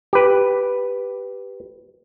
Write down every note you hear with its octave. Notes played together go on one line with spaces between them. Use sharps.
G4 B4